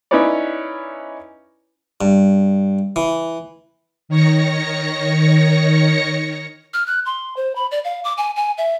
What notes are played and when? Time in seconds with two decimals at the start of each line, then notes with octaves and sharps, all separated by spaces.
0.11 C#4 D#4 E4 B4 C#5 D5
2.01 G2
2.96 E3
4.09 D#3 C#5 A#6 C#7
6.74 F6
6.86 F#6
7.06 C6
7.37 C5
7.56 B5
7.71 D5
7.85 F5
8.04 D6
8.18 G#5
8.36 G#5
8.58 E5